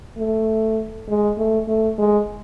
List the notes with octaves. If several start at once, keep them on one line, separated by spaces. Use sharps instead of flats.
A3
G#3
A3
A3
G#3